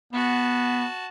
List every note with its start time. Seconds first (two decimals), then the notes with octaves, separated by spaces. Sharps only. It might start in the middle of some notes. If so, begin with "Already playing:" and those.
0.13 B3 F#4 A5